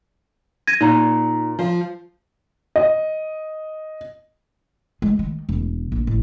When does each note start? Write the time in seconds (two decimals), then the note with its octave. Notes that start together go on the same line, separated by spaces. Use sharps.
0.67 G#6 A#6 D#7
0.81 A#2 D#4 A#5
1.59 F3
2.76 D#5
5.02 G#3
5.19 D#3
5.49 E1
5.92 A#1
6.07 A1